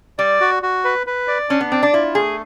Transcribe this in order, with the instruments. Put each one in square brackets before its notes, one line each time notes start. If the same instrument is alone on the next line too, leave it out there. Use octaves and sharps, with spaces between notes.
[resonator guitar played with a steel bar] G3 [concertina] D5
[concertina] F#4
F#4
B4
B4
D5
[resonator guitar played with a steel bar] C#4 [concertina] D4
[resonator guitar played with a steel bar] B3
[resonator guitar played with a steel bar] C4 [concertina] D5
[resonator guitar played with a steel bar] D4
[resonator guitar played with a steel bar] E4 [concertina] F4
[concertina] A3 [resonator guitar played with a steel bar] G#4